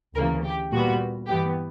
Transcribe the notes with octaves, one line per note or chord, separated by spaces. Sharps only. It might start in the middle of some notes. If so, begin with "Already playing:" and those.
D2 C#3 E3 A#3 A#4
G4
A#2 G3 B3 F#4
G2 E3 B3 G4